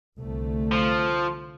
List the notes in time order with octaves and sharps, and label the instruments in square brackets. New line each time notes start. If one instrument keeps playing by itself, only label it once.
[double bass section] C2 D3 A3
[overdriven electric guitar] F3